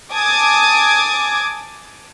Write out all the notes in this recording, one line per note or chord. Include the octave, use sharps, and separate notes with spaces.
G#5 A5 D6 D#6 G#6